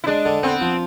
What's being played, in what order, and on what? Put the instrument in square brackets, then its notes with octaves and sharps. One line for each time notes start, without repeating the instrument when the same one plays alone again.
[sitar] E4
[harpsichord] G#3 [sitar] D4
[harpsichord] D3
[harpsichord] B3 [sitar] C4
[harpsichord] F3